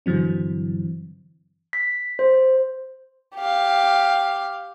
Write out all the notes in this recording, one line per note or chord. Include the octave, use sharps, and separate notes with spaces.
G2 D3 E3 F#3 C4
B6
C5
G4 F5